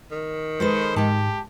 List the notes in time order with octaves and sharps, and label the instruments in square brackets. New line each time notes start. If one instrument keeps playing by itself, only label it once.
[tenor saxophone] D#3
[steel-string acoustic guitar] G#3 A4 B4 [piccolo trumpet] C5
[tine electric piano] G#2 [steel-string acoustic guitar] G#3 A5 [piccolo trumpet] G4